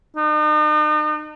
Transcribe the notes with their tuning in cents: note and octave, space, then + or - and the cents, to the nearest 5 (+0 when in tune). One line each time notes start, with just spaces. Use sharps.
D#4 -40